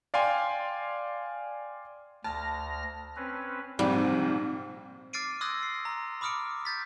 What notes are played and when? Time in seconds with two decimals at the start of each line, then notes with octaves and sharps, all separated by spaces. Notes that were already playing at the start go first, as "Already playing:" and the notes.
0.14 D5 F5 G5 G#5 C6
2.24 D2 A5 F6 A#6
3.16 C4 C#4 B4
3.79 A#1 G#2 C3 G3 A#3 C4
5.13 D6 F6 A6 C7 D7 D#7
5.41 C6 D#6 E6 F#6 G#6 A#6
5.63 C7
5.85 A#5 C6
6.21 B5 D6 D#6 F6 C#7 D7
6.65 G6 A6 B6